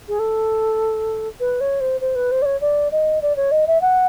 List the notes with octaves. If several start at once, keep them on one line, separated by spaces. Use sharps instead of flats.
G#4
A4
B4
C#5
C5
C5
B4
C5
D5
C#5
D5
D#5
D5
C#5
D#5
E5
F#5